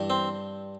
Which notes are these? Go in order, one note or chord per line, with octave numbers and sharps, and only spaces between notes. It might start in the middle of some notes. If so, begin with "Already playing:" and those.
Already playing: G2 E3
C4